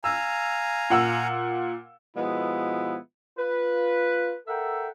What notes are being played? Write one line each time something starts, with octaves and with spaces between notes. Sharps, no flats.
F5 G#5 A#5 E6
A#2 F#5 E6
B2 F3 G#3 B3 E4
F4 B4
A4 A#4 E5 F#5 G5